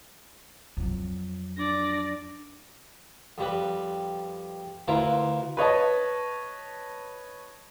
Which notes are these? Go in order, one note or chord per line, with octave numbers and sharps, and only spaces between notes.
F2 F#3
D4 D5 A#6
F2 G3 B4
D2 E4 F4 A#4 B4 F5
B4 C#5 D#5 A5